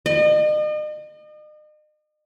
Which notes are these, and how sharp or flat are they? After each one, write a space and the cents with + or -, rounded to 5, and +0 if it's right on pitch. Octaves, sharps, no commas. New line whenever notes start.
D#5 -40